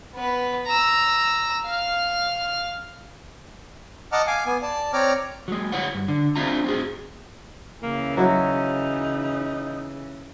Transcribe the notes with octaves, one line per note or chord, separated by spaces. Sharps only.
B3 B4
A#5 E6
F5 F6
D#5 F#5 A5 A#5 D6 F6
F5 G#5 D6
B3 G#5
D5 A5
C4 C#5 D5 A#5 D6 F6
F#3 G#3
F#3 E4 C#5 F#5
G2
D3
C4 D4 E4 F4 A#5
C4 F#4 G#4
C#3 E3 A#3
F#3 D#4 E4 F#4